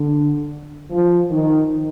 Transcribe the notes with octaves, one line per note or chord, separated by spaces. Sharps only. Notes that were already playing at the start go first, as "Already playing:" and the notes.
Already playing: D3
F3
D#3